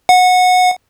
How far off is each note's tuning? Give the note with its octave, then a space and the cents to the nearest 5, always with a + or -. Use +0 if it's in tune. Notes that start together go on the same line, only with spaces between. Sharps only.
F#5 -20